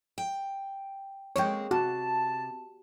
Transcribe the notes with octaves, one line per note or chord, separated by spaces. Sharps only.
G5
G#3 A#3 C4 C#5 G5
C3 F#4 A5